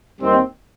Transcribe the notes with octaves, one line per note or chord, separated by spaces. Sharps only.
D#2 D#3 G3 C4 D#4